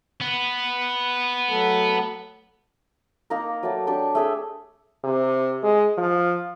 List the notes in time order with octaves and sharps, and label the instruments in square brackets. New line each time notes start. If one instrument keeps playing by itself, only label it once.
[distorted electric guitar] B3
[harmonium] F#3 A3 A4
[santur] A#3 D#4 A#5
F#3 A3 D5
D4 G4 G5 C#6
A3 G#4 E5
[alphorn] C3
G#3
F3